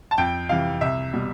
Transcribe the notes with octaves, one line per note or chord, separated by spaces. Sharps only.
A5
F2 G5
C3 E3 F5
C2 E5
B2 G3